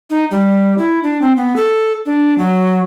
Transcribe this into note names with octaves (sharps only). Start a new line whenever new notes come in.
D#4
G3
E4
D4
C4
B3
A4
D4
F#3